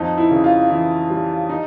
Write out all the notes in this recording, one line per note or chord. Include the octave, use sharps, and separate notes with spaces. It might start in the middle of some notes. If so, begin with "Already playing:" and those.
Already playing: F2 D#4
E4
C#3
F4
E3 E4
G3
D#4